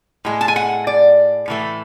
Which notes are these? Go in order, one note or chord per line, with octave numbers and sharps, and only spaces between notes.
A2 G#3
A5
G#5
F#5
D5
A2 E3 A3